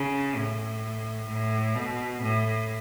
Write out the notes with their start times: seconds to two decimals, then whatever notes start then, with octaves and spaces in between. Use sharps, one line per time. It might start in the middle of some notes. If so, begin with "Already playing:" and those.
Already playing: C#3
0.36 A2
1.29 A2
1.75 B2
2.22 A2